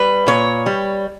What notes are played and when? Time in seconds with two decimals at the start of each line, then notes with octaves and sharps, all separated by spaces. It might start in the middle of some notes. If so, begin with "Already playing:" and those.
Already playing: G3 B4
0.27 A#2 C#5
0.66 G3